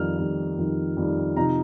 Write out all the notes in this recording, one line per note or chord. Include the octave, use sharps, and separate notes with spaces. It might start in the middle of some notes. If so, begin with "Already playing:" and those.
Already playing: F2 D#3 G3 D#4 F6
F2 D#3 G3 D#4
F2 D#3 G3 D#4
F2 D#3 G3 D#4
C3 F3 D#4 A#5